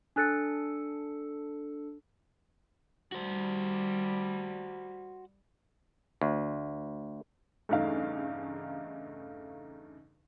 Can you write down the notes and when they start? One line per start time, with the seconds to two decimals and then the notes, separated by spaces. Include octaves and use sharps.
0.16 D4 A4 G#5 F#6 A6 C#7
3.12 G3 F#4 C5
6.21 D2
7.69 E2 G2 C#3 A3 D#4 F5